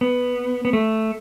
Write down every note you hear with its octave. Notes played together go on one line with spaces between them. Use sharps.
B3
B3
A3